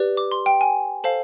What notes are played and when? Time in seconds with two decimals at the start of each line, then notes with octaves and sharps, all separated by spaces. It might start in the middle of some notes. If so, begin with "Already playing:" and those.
Already playing: G4 B4 D5
0.17 D6
0.32 C6
0.46 G5
0.61 G#5
1.04 A4 C5 F5 A5